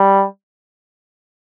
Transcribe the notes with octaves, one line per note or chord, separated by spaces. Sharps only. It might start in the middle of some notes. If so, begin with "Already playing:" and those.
Already playing: G3